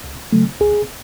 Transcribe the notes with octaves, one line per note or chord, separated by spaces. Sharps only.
C#2
C#3 F#3 A3
C#2 G#4